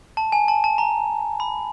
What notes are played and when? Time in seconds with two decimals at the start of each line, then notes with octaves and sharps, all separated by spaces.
0.17 A5
0.32 G#5
0.48 A5
0.64 A5
0.78 A#5
1.40 B5